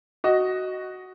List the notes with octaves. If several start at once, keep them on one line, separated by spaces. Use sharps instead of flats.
F#4 D#5